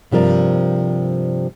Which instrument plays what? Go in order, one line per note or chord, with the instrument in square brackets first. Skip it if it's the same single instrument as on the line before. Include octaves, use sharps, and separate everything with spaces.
[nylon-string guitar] G2 C3 F3 A#4 D5